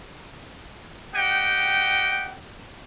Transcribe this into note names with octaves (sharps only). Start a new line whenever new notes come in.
G4 D#5 F#5 G5